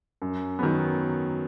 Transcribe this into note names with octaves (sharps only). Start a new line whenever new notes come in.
F#2
D#3 F#3 B3